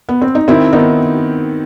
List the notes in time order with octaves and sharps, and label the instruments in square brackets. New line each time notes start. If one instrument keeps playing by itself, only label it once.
[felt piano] B3
C4
D#4
[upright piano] D#3 [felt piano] C4 E4
[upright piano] D#3 [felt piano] B3 D#4